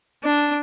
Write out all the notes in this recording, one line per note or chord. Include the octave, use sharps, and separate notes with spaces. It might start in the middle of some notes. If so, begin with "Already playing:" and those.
D4